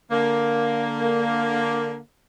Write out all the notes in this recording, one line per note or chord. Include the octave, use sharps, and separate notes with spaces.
D3 A#3